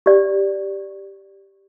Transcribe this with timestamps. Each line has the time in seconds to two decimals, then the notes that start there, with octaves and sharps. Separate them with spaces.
0.06 G4 D5